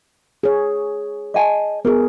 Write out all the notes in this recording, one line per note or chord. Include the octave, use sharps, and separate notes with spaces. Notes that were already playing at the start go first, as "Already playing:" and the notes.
G#4 C#5
D#5 G#5 A5
B3 G#4 A#4